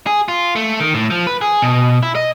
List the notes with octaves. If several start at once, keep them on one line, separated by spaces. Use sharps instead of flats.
G#4
F4
A3
D#3
A2
F3
B4
G#4
B2
E4
D#5